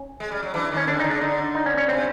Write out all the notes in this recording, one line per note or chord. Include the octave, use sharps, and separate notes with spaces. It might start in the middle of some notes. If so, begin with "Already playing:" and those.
Already playing: C#4
G#3
G3
F#3
E3 D4
D#3
C#4
D3 D4
C#3 D#4
D4
D3 D#4
D#4
C#4
C#4
C3 C4